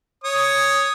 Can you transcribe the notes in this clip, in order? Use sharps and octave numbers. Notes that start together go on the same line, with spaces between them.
C#5 D#6